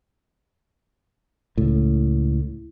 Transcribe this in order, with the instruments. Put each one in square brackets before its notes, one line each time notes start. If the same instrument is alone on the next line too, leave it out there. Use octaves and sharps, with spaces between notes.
[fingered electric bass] C#2 A2